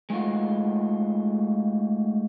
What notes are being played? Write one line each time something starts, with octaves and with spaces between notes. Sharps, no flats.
G#3 A3 D#4 F4 F#4